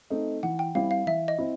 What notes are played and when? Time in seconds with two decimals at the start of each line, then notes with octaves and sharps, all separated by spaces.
0.10 A3 C4 D#4
0.43 E3 F#5
0.59 G5
0.75 G3 C4 E4 F5
0.91 F5
1.07 E3 E5
1.28 D#5
1.38 C4 E4